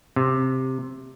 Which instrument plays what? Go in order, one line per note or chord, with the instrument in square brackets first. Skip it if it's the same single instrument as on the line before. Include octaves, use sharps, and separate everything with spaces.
[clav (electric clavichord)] C3